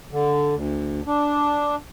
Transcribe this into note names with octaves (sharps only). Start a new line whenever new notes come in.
D3
D2
D4